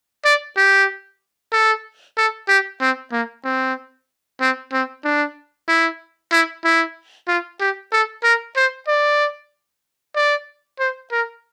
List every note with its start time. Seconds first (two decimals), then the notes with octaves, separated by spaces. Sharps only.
0.25 D5
0.57 G4
1.53 A4
2.17 A4
2.48 G4
2.81 C4
3.12 A#3
3.44 C4
4.41 C4
4.73 C4
5.05 D4
5.68 E4
6.32 E4
6.64 E4
7.28 F4
7.60 G4
7.92 A4
8.24 A#4
8.56 C5
8.88 D5
10.16 D5
10.79 C5
11.12 A#4